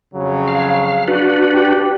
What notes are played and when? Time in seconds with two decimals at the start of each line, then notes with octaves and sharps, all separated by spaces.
0.14 F2 C#3 F#3
0.48 F5
1.08 D4 F#4 B4
1.52 G4